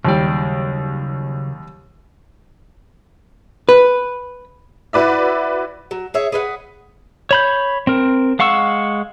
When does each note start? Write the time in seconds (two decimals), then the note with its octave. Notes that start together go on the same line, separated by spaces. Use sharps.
0.05 D#2 C#3 F#3 G3 D5
3.69 B4
4.93 E4 F#4 B4 D5 E5
5.91 F#3
6.14 G#4 C#5 E5
6.32 G#4 B4 F5 F#5
7.31 C#5 B5 G6
7.87 C4 A#4
8.39 G#3 F5 F#5 C#6 E6